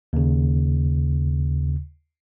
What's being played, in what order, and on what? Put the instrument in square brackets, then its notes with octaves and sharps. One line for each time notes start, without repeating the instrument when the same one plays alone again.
[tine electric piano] D#2 C#3